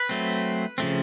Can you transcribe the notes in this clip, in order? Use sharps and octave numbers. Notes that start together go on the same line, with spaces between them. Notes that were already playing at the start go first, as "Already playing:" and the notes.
Already playing: B4
F#3 A3 C4
C#3 F3 A3 C4